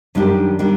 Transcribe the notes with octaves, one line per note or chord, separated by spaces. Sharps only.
F#2 D#3 G3 D4 G4
D#3 G3 D4 G4